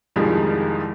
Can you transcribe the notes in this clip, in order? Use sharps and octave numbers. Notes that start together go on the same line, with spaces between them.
C2 F2 D#3 F3 G3 G#3